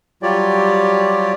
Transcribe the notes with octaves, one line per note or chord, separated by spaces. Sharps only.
F#3 G3 F4 G4 C#5 D5